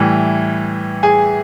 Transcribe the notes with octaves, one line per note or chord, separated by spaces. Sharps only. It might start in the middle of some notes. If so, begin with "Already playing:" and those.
Already playing: A2 E3 G3
G#4 G#5